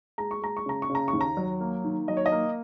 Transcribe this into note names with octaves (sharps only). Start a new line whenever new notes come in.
G#3 A#5
C#6
G#3 A#5
C#6
C#3 A#5
C#6
C#3
A#5
C#6
D#2
A#5
F#3
A#3
D#3
F#3 D#5
C#5
D#5
A#3